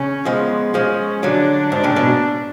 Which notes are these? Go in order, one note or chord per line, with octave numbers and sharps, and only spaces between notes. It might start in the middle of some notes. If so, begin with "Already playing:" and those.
Already playing: C#3 C#4
F3 G#3 B3
F3 G#3 C#4
D3 F#3 D4
G#2 D4
A2 C#3
G#2 B2